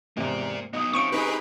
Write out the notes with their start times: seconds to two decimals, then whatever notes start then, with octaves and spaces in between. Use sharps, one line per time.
0.17 E2 G#2 C3 A#3 D5
0.73 B3 D#4 D#5 D#6
0.93 C4 C#4 D#4 F4 C#6 C#7 D7
1.12 C4 D#4 G4 G#4 B4